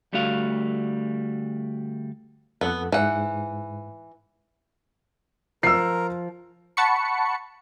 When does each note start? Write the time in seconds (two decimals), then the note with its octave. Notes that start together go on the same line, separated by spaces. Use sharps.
0.13 D2 G3 A3 F#4 F5
2.61 F2 B3 A4 F#5
2.92 G#2 E3 F#5
5.63 F3 A#4 E6 C7
6.77 F#5 A5 B5 C#6 C#7